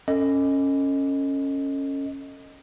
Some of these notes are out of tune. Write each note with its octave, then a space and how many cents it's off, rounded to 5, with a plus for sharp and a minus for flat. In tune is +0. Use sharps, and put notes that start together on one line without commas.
C#4 -10 A4 +25 D#5 +0